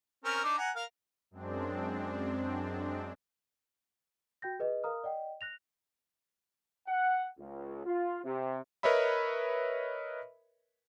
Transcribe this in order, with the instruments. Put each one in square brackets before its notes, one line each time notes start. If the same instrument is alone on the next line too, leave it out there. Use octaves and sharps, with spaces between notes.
[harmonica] C4 C#4 A#4
D4 D#4 D6
F#5 G#5 A#5
A#4 F5
[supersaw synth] F#2 G#3 C4 D4
[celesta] F#4 G5 G6 A#6
G#4 B4 D#5
A#4 F5 A#5 D#6 F6
D5 D#5 F#5 G5
F#6 A#6 F7
[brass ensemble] F#5
C#2
F4
C3
[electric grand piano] A#4 B4 C#5 D#5 E5 B5